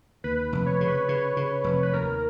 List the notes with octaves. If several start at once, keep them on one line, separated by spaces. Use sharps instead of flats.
D#2 B4
F1
C#5
C#3
B4
C#3 C#5
C#3
F1
B4
D#2 A#4